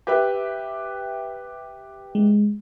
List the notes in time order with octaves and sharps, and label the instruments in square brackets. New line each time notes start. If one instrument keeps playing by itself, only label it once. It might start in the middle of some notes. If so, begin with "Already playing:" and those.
[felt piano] G4 B4 E5
[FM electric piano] G#3